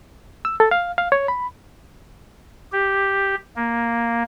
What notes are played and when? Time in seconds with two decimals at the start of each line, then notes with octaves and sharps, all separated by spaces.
0.45 E6
0.60 A4
0.71 F5
0.98 F5
1.12 C#5
1.28 B5
2.72 G4
3.56 A#3